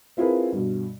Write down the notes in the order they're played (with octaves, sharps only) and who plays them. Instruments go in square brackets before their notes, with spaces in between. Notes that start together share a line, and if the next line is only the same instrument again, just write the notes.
[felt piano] C4 E4 F4 G#4 A#4 B4
G2 B2